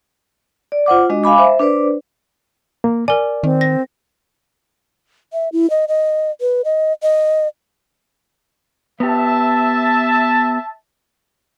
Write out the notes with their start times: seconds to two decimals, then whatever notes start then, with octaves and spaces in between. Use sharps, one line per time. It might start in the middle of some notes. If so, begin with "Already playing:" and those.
0.72 D5
0.86 F4 C5 F#5 D6
1.09 G#3 D4 F#4 D#5
1.24 F5 G#5 B5 D6
1.38 C5 E5
1.59 D4 B4 C5 D5
2.84 A#3
3.08 A#4 D5 G#5
3.43 D#3 C4
3.61 A#6
5.33 E5
5.52 E4
5.70 D#5
5.88 D#5
6.41 B4
6.65 D#5
7.03 D#5
9.00 B3 G4 E5 A5